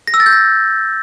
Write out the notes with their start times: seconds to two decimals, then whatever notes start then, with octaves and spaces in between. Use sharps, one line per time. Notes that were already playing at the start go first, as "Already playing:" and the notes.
0.07 A#6
0.14 E6
0.20 A6
0.26 G6
0.32 A#6